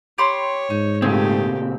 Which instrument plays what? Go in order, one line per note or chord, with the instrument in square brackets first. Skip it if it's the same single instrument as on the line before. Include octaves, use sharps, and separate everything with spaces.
[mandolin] G4 B5 C6 [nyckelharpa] C#5
[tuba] G#2 [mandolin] D#4
[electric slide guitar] A#2 C#3 C4 [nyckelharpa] A3 G4 [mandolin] G#4